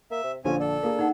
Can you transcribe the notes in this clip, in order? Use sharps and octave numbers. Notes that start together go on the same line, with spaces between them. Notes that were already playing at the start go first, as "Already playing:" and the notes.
A#3 E5
C3
A#1 D3 F3 C#4 G#5
D4 A4
A#3 G#4 A#4
D#4 F#5